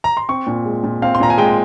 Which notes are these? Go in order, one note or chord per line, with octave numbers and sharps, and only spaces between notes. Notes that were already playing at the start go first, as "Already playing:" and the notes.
A#5
C6
C4 C#6
A#2
G#3
A#2
C4 F5
C6
A#2 A#5
G#5
G#3 G5